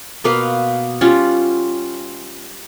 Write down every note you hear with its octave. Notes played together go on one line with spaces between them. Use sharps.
B2 A#3 B4 F5
G3 C#4 F4 F#5